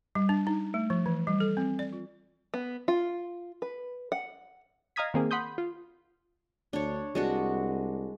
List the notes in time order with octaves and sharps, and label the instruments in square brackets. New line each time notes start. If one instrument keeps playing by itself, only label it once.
[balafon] G3
D4
D#4
A3
F3
E3
G3
A4
C4
D5
F4
[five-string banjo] B3
F4
B4
F#5
[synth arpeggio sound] D#5 F5 A#5 D#6 G#6 B6
D#3 A#3 C4 G#4
F#5 B5 C6 D#6 G6
F4
[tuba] D2 [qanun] D4 C#5
[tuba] C2 [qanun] G#3 D4 F#4